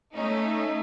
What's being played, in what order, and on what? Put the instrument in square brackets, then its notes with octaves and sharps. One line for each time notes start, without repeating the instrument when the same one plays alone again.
[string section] A3 C#4 D#4